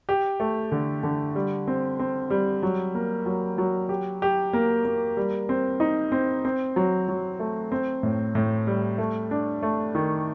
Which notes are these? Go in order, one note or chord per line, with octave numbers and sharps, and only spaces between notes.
G4
A3
D3
D3
G3
C4
C4
G3
F#3
A#3
F#3
F#3
G4
G4
A#3
A#3
G3
C4
D#4
C4
C4
F#3
F#3
A3
C4
A2
A2
G3
A3
D4
A3
D#3